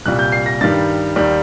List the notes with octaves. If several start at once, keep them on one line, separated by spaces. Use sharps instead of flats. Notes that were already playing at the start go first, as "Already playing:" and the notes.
C2 A#2 G3 F#6
G6
C7
A#6
G2 D#3 G3 A6
D#2 D#3 G3